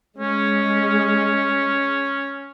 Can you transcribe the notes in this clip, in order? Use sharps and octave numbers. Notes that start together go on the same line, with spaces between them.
G#3 C#4